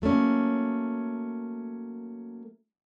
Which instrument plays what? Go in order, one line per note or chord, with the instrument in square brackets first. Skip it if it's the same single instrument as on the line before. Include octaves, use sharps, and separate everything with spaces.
[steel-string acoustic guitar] F#3 A3 A#3 C#4